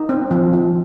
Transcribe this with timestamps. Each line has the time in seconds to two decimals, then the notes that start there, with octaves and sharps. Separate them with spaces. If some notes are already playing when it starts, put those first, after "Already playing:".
Already playing: D#4
0.09 C4
0.31 F3
0.53 F3